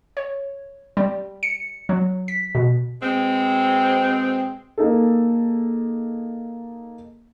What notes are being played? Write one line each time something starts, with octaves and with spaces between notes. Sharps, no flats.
C#5
G3
C#7
F#3
B6
B2
B2 G#3 C4
A#3 D#4 G#4 A4